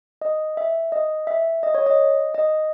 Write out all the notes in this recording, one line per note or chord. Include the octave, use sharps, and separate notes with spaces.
D#5
E5
D#5
E5
D#5
C#5
D#5
D#5